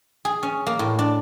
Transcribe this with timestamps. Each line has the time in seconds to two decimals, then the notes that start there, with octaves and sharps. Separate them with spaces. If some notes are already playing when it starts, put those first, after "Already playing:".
0.25 G#4
0.43 C#4
0.67 A#3
0.79 A2
0.99 D4